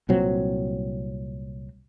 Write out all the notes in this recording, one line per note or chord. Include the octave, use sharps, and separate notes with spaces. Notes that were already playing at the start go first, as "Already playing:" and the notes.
C2 A#2 F#3 C4